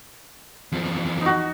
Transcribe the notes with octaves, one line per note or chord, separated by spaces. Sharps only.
E2 F3
D#4 F#4